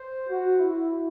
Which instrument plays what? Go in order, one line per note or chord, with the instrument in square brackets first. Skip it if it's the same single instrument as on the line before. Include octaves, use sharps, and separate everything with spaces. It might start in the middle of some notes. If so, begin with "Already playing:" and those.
Already playing: [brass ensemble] C5
F#4
E4